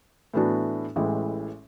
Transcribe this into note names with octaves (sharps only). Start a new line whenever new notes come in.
A2 E3 B3 D4 F#4
A1 A2 E3 G#3